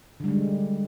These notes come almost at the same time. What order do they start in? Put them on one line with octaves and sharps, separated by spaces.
D3 G3 G#3